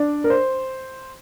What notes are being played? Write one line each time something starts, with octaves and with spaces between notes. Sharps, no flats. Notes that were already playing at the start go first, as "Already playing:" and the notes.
Already playing: D4 D5
A#4
C5